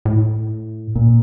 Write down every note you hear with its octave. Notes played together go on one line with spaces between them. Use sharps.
A2
A#2